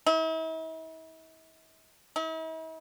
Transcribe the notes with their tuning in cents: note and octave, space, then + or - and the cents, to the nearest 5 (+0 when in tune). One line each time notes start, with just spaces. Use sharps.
E4 -45
E4 -45